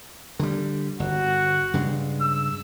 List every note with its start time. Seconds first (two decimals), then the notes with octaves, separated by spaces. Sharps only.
0.39 D3 G3
1.00 G1 F#4
1.74 G2 C#3 G#3
2.21 E6